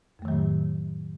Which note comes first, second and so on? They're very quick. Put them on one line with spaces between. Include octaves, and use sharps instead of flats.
F2 A3 D#3 F#3 A2